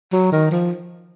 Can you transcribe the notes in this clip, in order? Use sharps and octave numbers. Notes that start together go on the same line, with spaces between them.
F#3
D#3
F3